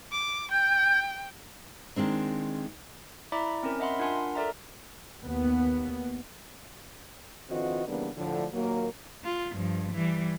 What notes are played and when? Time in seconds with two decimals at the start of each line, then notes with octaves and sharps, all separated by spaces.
0.12 D6
0.51 G5 G6
1.96 D#3 G#3 C4 D4
3.32 E4 D5 E5 A#5 B5 D6
3.63 C4 C#4 A#4
3.80 D#5 E5 F#5 B5 C6
3.99 D4 F4 A#4 F#5 G#5 C6
4.35 A4 A#4 D5 E5 A#5
5.23 D#2 B3
7.50 D3 E3 C4 F4 F#4 D#5
7.87 C#3 E3 G3 A#3 B3 D4
8.17 A2 D3 F3
8.53 D#2 A#2 F#3 A#3
9.24 F4
9.53 G2 F3
9.93 E3 G3